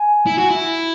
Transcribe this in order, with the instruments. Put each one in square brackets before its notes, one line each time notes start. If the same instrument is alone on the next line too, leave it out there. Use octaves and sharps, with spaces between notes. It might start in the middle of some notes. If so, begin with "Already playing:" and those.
Already playing: [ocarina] G#5
[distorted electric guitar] E4
F#4
E4